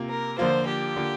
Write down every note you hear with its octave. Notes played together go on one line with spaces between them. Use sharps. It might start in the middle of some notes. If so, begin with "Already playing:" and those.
Already playing: C3 A#3 F4
A#4
D3 F3 A#3 F4 C5
G4
D3 A#3 F4